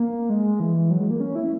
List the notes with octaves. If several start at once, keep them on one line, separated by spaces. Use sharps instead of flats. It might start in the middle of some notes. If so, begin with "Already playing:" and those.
Already playing: A#3
G#3
E3
F#3
G#3
A#3
C#4
E4